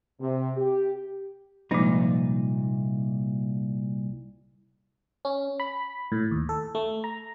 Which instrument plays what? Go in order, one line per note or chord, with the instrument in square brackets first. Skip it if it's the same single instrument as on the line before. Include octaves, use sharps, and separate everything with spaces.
[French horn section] C3
G4
[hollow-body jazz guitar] C2 A#2 D#4 [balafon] F3 G#3
[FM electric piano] C#4
B5
A2
D#2
A4
A3
A#5